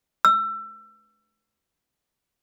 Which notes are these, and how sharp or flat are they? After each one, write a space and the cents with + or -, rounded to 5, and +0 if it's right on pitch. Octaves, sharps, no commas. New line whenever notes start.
E6 +25